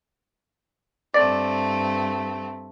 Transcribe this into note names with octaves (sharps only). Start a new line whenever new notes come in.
G2 A3 C4 D5